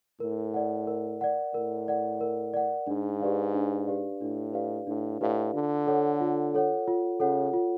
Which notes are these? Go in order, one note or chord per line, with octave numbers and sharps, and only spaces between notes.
A2 A#4
D5 F#5
A#4
D5 F#5
A2 A#4
D5 F#5
A#4
D5 F#5
G#2 D4
G4 B4 D5 F5
D4
G4 B4 D5 F5
A2 D4
G4 B4 D5 F5
A2 D4
A2 G4 B4 D5 F5
D3 F4
A4 C#5 F#5
F4
A4 C#5 F#5
F4
C#3 A4 C#5 F#5
F4